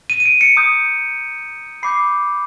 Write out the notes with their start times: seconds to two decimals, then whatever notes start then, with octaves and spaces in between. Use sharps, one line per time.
0.10 D#7
0.20 D#7
0.25 D7
0.41 C#7
0.56 A#5 D#6 G6
1.83 B5 D6 G6 C7